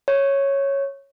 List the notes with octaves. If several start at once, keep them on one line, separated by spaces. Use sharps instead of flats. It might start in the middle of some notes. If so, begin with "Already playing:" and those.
C#5